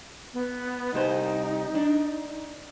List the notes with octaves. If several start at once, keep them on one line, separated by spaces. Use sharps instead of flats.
B3
C2 G3 D#4 C5
D4